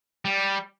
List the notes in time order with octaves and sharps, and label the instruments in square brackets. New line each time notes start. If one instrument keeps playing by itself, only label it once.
[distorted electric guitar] G3